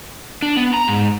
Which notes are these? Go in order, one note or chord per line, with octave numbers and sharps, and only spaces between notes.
D4
B3
A#5
G#2